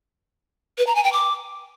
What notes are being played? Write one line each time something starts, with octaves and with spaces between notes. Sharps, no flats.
B4
A#5
G#5
G5
D6